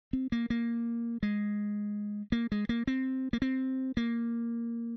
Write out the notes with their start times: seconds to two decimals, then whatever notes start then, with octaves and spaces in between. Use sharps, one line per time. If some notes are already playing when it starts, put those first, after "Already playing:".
0.13 C4
0.32 A#3
0.50 A#3
1.23 G#3
2.32 A#3
2.52 G#3
2.69 A#3
2.87 C4
3.33 A#3
3.42 C4
3.97 A#3